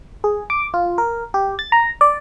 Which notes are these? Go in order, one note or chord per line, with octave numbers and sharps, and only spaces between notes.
G#4
D6
F4
A#4
G4
A6
A#5
D5